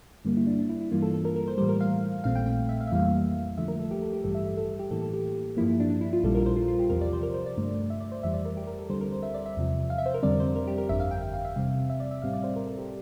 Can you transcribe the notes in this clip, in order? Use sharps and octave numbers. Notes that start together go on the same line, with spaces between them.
G2 D3 G3 A#3
E4
D4
D4
E4
E4
G2 E3 G3 A#3 F4
A4
A4
A#4
A#4
C5
A2 E3 G3 C5
A#4
F5
A#1 A#2 A3 C4 F5
G5
G5
E5
F5
E5
F2 E3 G3 A#3 F5
D2 D3 F3 A3 E5
A#4
A4
G4
A4
G4
A1 G2 E3 G3 A4
E5
E5
A4
G4
A2 E3 A#3 A4
A4
G4
G2 F3 A#3 E4
E4
D4
D4
E4
F4
A#1 A#2 G3 A4
A#4
C5
F4
F4
G4
E2 C3 F3 A#4
D5
C5
A#4
C5
D5
G2 D3 A3
E5
D5
C5
F2 E3 G3 E5
D5
A#4
G4
A#4
A4
D2 D3 G3 C4 C5
A#4
C5
E5
D5
E5
E2 C3 F3
F5
E5
C5
A#4
F2 D3 G3 C4 D5
C5
A#4
G4
A#4
G1 F2 D3 E5
F5
G5
G5
F5
E5
E2 C3 G3 C4 F5
E5
D5
E5
A1 A2 G3 C4 F5
D5
C5
A#4
A4
G4